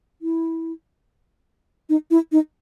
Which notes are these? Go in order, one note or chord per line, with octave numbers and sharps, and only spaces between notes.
E4
D#4
E4
D#4